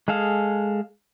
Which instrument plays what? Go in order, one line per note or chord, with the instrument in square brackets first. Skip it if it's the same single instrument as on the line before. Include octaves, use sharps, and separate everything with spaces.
[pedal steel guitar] G#3 G#4 A4 F5